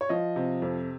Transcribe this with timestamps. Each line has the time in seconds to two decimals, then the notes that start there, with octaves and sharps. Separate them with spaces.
0.01 C#5
0.09 F3 D#5
0.36 C3
0.62 F2